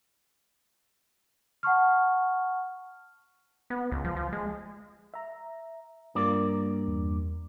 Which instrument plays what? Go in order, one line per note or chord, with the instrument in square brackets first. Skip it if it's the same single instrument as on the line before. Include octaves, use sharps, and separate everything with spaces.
[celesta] F#5 A5 C#6 F6
[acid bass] B3
C#2
F3
F3
G#3
[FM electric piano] E5 A#5
[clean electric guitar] G2 A#3 D5 [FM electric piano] F4 A#4
[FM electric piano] E2